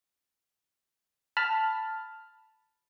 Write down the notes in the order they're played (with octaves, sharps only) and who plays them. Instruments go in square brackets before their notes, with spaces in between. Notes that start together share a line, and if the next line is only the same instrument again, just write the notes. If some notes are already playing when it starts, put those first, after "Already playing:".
[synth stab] A5 B5 F6